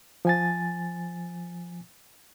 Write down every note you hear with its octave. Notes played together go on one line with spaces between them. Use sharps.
F3 G#5 A6